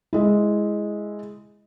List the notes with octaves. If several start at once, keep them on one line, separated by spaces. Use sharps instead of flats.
G#3 E4